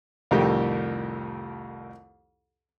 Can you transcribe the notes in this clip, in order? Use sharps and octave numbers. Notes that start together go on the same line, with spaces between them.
C2 F2 A2 D#3 G4